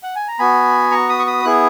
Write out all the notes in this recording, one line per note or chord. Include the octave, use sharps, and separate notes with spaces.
F#5
G#5
A#5
B3 F#4 G#5 B5
A#5 C#6
B5 D#6
C#6
B5 D#6
B3 E4 G#4 F#6